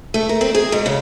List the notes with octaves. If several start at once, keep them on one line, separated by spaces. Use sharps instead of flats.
A3
A#4
C4
G#4
G#2
C#3